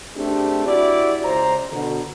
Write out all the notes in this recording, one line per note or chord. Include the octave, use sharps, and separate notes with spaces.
A3 C4 D4 G4 G#4
E4 F#4 G4 D5
C#2 C5 A#5
B2 D3